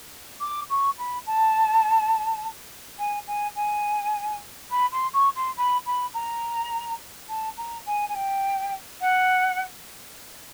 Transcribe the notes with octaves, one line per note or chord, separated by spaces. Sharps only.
D6
C#6
B5
A5
G#5
G#5
G#5
B5
C6
C#6
C6
B5
B5
A#5
A5
A#5
G#5
G#5
G5
F#5